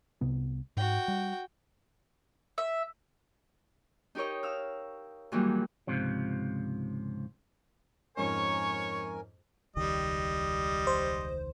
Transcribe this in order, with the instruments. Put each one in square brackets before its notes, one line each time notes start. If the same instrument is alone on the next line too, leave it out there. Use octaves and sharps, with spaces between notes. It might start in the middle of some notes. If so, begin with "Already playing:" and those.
[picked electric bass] C2 C3 B3
[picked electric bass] G#2 [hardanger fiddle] F#4 G5
[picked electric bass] G3
[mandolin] E5
[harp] D#4 G4 A#4 C#5 D#5
F5 E6 F6
G#2 D#3 E3 F#3 G3 A#3
[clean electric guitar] C#2 G#2 C3 F3
[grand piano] F2 G#2 C#4 [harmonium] A#4 G#5 [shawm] C#5 [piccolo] C#6
[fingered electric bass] E1 C#2 D#3 [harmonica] G3 D#5
[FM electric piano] C5